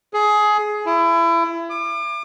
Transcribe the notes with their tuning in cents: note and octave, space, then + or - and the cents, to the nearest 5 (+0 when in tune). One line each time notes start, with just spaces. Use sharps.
G#4 +20
E4 +30
D6 +35